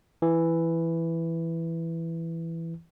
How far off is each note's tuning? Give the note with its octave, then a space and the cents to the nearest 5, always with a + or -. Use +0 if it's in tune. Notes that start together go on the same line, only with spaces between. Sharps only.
E3 +5